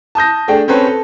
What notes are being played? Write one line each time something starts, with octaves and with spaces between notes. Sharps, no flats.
A5 D#6 G6 A#6
A3 D4 G#4 G5
C4 C#4 A4 B4 C#5
A4